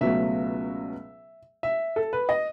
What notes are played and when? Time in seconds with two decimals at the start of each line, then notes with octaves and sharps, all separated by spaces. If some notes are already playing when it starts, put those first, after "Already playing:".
0.01 C#2 B2 F#3 A3 E5
1.63 E5
1.96 A4
2.13 B4
2.29 D#5